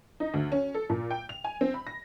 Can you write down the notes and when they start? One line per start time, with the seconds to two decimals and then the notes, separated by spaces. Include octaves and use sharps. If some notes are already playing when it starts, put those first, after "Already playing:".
0.20 D#4
0.34 D2
0.52 C#4
0.74 A4
0.90 A#2
1.11 G5
1.29 F7
1.44 G#5
1.61 C4
1.74 B5
1.87 A#6